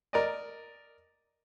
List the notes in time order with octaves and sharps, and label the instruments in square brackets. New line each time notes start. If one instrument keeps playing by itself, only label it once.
[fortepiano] A#4 D5 D#5